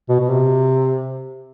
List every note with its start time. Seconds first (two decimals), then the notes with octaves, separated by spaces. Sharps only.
0.09 B2
0.20 B2
0.30 C3